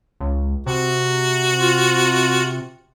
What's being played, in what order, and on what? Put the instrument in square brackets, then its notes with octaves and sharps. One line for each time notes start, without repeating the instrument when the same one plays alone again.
[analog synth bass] C#2
[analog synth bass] C3 [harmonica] F#4
[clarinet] F4